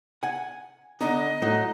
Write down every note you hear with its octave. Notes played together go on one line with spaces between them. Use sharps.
F#5 G#5
D3 B3 D#4 D#5
A2 F#3 D#4 F#4